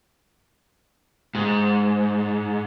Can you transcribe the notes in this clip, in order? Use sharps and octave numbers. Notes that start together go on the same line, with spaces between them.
G#2